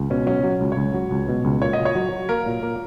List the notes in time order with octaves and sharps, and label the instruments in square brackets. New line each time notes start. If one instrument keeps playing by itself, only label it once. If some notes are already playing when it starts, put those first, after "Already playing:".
Already playing: [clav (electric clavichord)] C#2
[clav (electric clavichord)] B2 [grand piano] C#4
[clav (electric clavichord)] F#3 [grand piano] C#4
[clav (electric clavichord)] F#3
C#2
[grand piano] C#5
[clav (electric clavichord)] C#2
F#3
C#2
B2
C#2
[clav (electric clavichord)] A#2 [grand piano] C#5
[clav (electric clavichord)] F#3 [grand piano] D#5
[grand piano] C#5
[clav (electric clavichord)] F#3
F#3
[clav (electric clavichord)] A#3 [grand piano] A#4
[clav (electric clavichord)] A#2
A#3